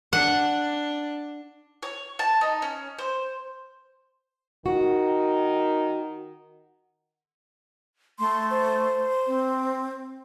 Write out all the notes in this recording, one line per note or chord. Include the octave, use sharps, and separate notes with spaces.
D4 F#5
C#5
A5
D#4
C#4
C5
D#3 F#4
A3 C6
C5
C4